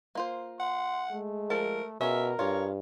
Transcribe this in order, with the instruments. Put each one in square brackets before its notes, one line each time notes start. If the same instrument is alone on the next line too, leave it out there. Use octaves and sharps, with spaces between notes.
[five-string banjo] A#3 F4 C5
[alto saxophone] F#5 [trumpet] C6
[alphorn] G#3 [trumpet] A3
[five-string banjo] F3 A5 [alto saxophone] A#4
[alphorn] B2 [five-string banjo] C#4 F4 G#4 [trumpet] A#4 [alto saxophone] E5
[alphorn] G2 [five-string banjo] F4 G#4 [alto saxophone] C#5